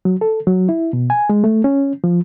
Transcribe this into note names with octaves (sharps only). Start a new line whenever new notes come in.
F#3
A4
F#3
E4
B2
G#5
G#3
A3
C#4
F3